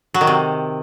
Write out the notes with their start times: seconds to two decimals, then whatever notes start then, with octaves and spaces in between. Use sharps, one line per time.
0.14 F#3
0.21 D#3
0.27 C3